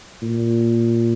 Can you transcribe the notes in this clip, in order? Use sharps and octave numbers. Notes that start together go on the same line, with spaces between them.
A#2